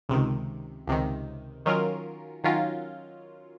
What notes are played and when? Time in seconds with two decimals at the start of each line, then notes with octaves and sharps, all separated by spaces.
0.09 C#2 C3 D#3
0.87 C#2 C3 D#3
1.66 D#3 F#3 C#4 F4 A#4
2.44 D#3 F#3 C#4 F4 A#4